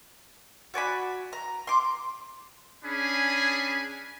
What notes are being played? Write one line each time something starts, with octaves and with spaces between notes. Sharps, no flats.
F#4 D5 G#5 B5
A#5
C6 D6
C#4 D4 G#4 G#5 B5